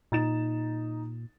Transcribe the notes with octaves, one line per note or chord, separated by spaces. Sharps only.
A#2 D#4 A6 E7